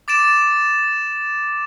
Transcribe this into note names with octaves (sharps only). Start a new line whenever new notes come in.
D6 A6 D7 E7